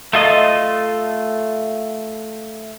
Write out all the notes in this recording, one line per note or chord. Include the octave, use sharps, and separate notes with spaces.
A3 F4 D#5